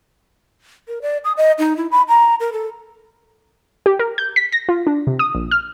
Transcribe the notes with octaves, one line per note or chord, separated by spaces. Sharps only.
A#4
D5
D#6
D#5
D#4
E4
B5
A#5
A#4
A4
G4
A#4
G6
B6
A#6
F4
D4
C3
D#6
A#1
F6